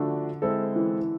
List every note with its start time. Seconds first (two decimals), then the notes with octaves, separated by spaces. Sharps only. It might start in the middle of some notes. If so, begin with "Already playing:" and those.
Already playing: D3 F3 A3 D4 F#4
0.42 G#3 C4 E4 A4
0.76 E3